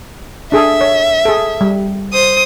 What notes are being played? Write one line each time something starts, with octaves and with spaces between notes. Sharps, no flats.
D4 G#4 A4 E5
C#5
G#4 A4
G3
C5 D#6